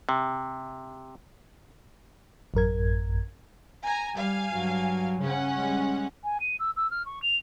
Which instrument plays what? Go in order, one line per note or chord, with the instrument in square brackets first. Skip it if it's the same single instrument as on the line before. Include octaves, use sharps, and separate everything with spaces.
[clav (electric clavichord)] C3
[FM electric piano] A1 F#2 A#4 G#6
[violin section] G#5 A#5
[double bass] G3 [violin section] F5 G#5
[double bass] G2 F#3
[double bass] C#3 [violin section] C#4 F#5
[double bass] G3 G#3
[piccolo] G#5
D#7
E6
E6
F6
C#6
F7